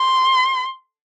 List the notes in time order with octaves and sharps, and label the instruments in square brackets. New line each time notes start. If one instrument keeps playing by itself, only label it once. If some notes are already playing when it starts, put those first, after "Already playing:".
Already playing: [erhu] C6